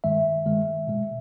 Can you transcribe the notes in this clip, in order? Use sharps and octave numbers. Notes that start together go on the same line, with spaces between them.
G2 D#3 G#3 E5
G2 D#3 G#3
B2 G#3